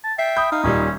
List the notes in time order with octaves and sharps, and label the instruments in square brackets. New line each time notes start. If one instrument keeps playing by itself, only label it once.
[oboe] A5
[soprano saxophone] E5 [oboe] G5 [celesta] C7
[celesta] B5 D#6 [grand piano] G6
[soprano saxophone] D#4 [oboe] F5
[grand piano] D#1 A#2 G3 [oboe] C#4